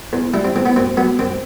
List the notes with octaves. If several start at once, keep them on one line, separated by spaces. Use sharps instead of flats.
E2
G3 E4
C4
E2 C4
B3
F#2 C4
F#3 B3
F#2 C4